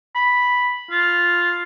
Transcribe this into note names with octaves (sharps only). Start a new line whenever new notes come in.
B5
F4